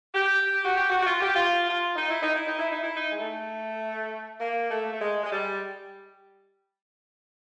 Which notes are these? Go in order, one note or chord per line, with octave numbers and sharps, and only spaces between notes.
G4
F#4
G4
F#4
F#4
F4
G4
F4
F4
D#4
E4
D#4
E4
D#4
E4
D#4
E4
D#4
G#3
A3
A#3
A3
A3
G#3
G#3
G3